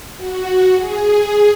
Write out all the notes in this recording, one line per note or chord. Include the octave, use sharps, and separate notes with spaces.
F#4
G#4